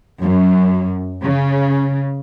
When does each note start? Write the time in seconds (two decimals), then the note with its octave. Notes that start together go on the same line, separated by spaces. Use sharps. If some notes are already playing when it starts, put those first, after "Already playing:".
0.21 F#2
1.22 C#3